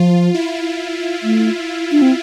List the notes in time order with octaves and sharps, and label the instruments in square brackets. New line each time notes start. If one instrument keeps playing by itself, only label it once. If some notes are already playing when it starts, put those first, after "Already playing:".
Already playing: [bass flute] F3 [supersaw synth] F4
[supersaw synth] E4
[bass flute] A3
D4
C4